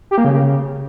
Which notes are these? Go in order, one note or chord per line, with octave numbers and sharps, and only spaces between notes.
G4
A#3
C#3